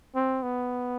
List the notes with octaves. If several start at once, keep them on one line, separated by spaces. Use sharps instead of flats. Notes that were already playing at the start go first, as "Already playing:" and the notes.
C4
B3